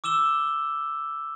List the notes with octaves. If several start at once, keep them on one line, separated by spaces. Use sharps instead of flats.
D6 E6 E7 G7